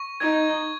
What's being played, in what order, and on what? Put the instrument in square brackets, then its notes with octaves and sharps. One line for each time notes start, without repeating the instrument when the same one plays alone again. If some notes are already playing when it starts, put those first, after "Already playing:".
Already playing: [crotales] C#6
[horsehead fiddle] D#4 [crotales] G#6